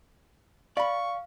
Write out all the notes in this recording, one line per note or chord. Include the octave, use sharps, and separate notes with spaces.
D5 F5 B5 C#6